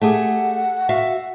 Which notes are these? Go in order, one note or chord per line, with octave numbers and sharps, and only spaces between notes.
A3 G4 G#4 F#5
F#4 E5 F5